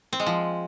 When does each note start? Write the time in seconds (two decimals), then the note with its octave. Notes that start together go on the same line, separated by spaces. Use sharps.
0.13 C4
0.20 G#3
0.26 F3